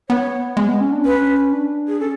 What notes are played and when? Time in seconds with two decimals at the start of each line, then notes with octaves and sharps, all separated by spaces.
0.09 B3 C#5
0.57 G#3
0.69 B3
0.81 C#4
0.92 D4
1.04 C#4 B4
1.53 D4
1.88 G#4
2.00 C#4 A4